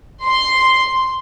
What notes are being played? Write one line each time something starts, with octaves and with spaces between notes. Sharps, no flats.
C6